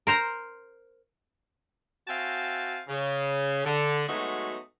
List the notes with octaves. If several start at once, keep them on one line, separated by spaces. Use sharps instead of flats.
A#4 C5 A#5
C4 F#4 E5 F5 G#5 A5
C#3
D3
F#3 G#3 A3 B3 D#4 F#4